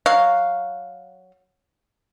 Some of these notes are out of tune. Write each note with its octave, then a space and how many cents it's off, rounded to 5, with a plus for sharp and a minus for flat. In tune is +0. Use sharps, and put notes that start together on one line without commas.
F#3 +0 F5 +0